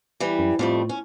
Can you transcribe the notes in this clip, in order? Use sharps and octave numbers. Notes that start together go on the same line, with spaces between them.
E3 G3
F#2
F2 A2 G3 A3
C#4